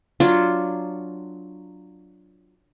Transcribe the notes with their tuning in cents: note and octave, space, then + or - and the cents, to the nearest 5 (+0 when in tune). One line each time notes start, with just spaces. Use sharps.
F#3 +0 D4 +0 F4 +0